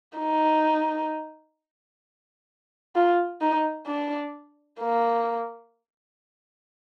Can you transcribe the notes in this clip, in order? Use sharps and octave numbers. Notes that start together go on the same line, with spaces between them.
D#4
F4
D#4
D4
A#3